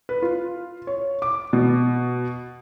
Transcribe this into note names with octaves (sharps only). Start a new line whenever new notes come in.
B4
F4
C#5
D6
B2